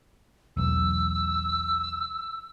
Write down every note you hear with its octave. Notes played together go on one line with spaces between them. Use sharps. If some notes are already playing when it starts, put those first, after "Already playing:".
E1 B1 E6